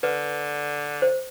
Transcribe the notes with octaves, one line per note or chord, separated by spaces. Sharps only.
D3 B4
C5